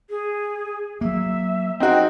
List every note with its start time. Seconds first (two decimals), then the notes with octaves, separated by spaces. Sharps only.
0.10 G#4
1.01 F#3 A#3 E5
1.80 C4 D#4 F#4 G5